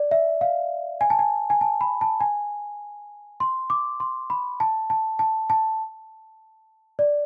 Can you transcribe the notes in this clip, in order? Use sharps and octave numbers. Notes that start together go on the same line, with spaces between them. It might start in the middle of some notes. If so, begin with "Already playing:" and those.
Already playing: D5
E5
F5
G#5
A5
G#5
G#5
A5
B5
A5
G#5
C6
D6
C6
B5
A5
A5
A5
A5
D5